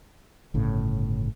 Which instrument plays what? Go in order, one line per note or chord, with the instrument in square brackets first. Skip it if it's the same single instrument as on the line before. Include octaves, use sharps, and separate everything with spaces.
[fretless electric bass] G1 A2 C#3